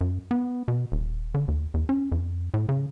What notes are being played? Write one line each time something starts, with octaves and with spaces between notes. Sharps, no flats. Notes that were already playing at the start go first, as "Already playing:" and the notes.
F#2
B3
B2
D#1
D3
D#2
E2
C#4
F2
A2
C#3